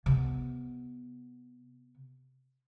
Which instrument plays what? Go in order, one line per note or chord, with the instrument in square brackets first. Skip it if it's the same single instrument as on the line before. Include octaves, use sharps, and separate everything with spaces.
[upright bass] C3 B3